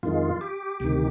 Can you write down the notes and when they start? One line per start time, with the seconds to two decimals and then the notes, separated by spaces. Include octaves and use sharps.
0.03 F2 D#3 G#3 F4
0.41 G4
0.80 D2 C3 D#3